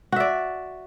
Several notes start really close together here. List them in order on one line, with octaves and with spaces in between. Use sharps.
F#4 E5 D5